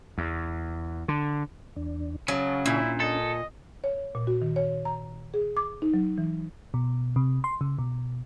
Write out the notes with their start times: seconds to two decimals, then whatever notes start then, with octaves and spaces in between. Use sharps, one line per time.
0.18 E2
1.08 D3
1.76 E2 D4
2.28 C#3 F#3 A5
2.66 A#2 C#4 D4 E4
3.00 A4 D#5
3.84 C#5
4.15 A#2
4.27 F#4
4.42 D#3
4.56 C#5
4.85 A#5
5.34 G#4
5.57 D6
5.82 D#4
5.94 F#3
6.18 E3
6.74 B2
7.16 C3
7.44 C6
7.61 C#3
7.78 B2